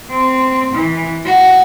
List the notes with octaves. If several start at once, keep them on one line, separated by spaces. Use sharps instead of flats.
C4
E3
F#4